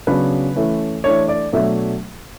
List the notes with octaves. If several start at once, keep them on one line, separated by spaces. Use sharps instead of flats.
C#3 F#3 B3 D4 B4
E3 A3 C#4
E3 A3 D4 C#5
D5
B2 F#3 A3 D4 E5